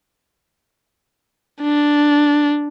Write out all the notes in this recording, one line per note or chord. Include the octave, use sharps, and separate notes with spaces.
D4